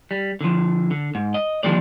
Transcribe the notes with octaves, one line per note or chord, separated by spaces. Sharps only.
G3
D3 F3
D3
G#2
D#5
D#2 D3 F3 G3 G#3 D5